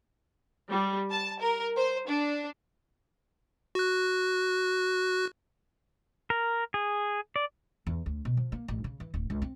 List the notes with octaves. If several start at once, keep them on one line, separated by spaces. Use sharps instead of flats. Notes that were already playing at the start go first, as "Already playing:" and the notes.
G3
A5
A#4
C5
D4
F#4 F#6
A#4
G#4
D5
E2
D2
B2
F3
A#3
A1
C#3
E3
D1
C#2
C4